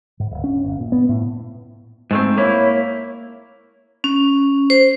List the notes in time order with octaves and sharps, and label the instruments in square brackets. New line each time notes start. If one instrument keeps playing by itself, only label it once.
[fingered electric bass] G#2
D1
C#4
G1
A#2
B3
A2
[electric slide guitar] G#2 A3 C4
[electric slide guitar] A#3 E4 [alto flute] C#5
[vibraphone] C#4
C5